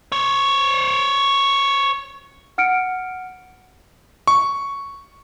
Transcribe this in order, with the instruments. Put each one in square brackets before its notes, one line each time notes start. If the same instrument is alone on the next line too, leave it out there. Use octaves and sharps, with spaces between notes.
[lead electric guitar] C5 C#5
[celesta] F#5 F6 C#7 D7
[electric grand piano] C#6